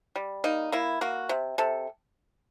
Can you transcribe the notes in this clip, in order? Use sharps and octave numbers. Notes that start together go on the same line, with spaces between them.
G3
A#3 D#4
A#3 E4
A#3 F#4
C3
C3 A4